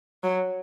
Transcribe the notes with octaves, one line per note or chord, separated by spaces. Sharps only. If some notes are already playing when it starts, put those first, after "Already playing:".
F#3